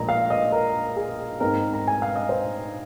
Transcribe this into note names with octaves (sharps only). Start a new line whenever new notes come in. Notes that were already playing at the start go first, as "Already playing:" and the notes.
Already playing: A#1 A#2 G#3 A#5
F5
D#5
A#4
G#4
G#2 G#3 C4 A#4
A#5
G#5
F5
D#5
C5